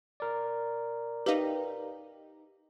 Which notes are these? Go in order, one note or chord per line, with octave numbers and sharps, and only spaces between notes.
A#4 D5
D#4 G4 B4 F5